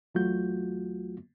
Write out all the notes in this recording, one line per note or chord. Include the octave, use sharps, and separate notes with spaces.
E2 F#3 A3 F4 F#4 G6